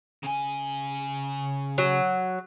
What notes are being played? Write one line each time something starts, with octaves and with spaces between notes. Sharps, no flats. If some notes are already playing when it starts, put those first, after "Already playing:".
C#3 G#5
F#3